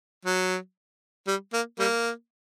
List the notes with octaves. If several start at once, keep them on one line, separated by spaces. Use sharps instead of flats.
F#3
G3
A#3
G3 A#3